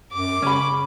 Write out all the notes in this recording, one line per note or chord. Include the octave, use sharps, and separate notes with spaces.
F#2 D6
C#3 C#4 B5